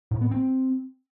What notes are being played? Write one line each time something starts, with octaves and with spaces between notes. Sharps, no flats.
A2
B3
C4